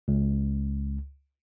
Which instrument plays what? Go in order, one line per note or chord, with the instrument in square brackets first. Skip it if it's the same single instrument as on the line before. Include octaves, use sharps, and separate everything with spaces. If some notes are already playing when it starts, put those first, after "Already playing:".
[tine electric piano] C#2